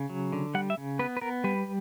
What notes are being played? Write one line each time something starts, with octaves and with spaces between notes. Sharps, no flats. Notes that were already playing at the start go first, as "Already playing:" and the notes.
Already playing: C#3
F#3
D3
G3 F#5
E5
C#3
B3 B4
B4
B3 A#4
G3 B4